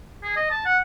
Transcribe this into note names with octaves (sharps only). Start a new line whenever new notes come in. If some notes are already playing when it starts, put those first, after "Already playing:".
G#4
D#5
A5
F#5